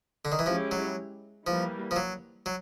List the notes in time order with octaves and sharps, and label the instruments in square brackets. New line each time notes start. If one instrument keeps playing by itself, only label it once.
[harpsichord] D3
D#3
E3
[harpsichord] F3 [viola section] G#3 C#4 E4 G4
[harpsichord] F#3
[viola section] E3 G3 A#3 [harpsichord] F3
[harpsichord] F3
F#3
F#3